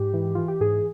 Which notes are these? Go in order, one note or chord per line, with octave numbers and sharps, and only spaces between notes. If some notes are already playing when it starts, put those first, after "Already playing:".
Already playing: G#2 G4
E3
E3 F4
G4
G#2 G#4